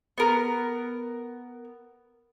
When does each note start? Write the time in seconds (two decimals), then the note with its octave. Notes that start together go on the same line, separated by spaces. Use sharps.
0.18 B3 A#4